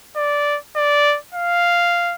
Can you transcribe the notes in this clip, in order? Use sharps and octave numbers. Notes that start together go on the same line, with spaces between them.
D5
D5
F5